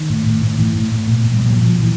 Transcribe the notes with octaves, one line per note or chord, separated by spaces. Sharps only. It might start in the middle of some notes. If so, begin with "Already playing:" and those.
Already playing: D#3
A2
A2
A2
A2 E3
A2
A2
A#2
A#2
G3
A#2 F#3
A#2 F3
A#2
E3